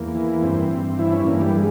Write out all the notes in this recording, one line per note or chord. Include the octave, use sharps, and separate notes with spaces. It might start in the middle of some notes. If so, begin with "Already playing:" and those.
Already playing: E2 A#3
E3
G2 C4
G2
E3 E4
C#4
G2 A#3
G3
G#3